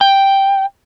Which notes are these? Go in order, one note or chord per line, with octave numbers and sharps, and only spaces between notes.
G5